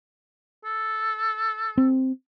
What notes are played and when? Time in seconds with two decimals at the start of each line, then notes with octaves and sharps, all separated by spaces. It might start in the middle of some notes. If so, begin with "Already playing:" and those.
0.65 A4
1.78 C4